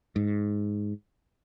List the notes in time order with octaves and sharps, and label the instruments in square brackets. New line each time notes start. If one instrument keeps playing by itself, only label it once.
[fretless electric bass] G#2